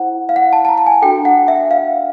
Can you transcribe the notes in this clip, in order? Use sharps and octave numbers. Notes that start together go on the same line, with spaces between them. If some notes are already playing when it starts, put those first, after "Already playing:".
Already playing: E4 A4 C5 F#5
F5
F#5
A5
A5
A#5
A5
G#5
D4 F#4 A4 G5
F#5
E5
F5